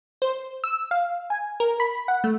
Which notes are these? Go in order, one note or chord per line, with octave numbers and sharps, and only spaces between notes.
C5
E6
F5
G#5
A#4
B5
F#5
A3